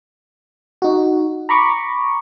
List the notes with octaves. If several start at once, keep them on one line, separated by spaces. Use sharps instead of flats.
D#4 F#4
A#5 B5 C#6 D6